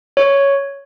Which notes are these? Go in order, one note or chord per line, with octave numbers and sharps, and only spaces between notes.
C#5